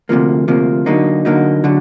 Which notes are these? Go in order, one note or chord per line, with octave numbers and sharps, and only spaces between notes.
D2 C3 F3 A#3
D2 C3 F3 A#3
D3 F#3 A#3 D#4
D3 F#3 A#3 D#4
D3 F#3